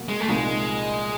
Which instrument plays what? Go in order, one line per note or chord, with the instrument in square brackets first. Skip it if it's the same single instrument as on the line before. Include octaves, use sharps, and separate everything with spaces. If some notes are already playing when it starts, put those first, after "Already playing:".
Already playing: [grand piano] B2 F#3 A#3
[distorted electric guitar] G#3
A3
[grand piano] C2 A#2 F3 A#3 D#4 [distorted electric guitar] G#3